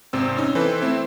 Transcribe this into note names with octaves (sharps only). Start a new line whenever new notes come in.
G#1 C3 C4 E6
C#4 D#4
E3 C4 A4 B4
A3 C4 E4